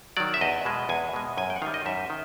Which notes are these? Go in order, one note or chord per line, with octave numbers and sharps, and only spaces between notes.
D#3 F#3 D5
E5
E2 D#5
B2 G#3
E2 G#5
B2 G#3
F#2 G#5
G5
F#5
D#3 G3 F5
D#5
F#2 E5
D#3